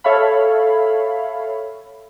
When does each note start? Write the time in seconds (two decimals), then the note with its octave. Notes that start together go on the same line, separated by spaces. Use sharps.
0.04 A4 C#5 E5 F5 B5